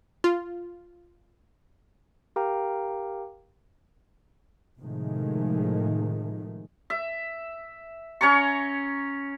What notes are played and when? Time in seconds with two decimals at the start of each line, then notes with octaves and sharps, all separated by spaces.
0.24 F4
2.36 G4 A#4 F5 G5 A#5
4.79 A2 C3 D#3 F3 G#3 A3
6.90 E5
8.21 C#4 C#5 A#5 C#6